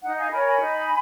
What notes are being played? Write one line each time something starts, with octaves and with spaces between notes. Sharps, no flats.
D#4 D#5 F#5
F5 G#5
A#4 C#5 G#5 B5
G#5 B5
D#4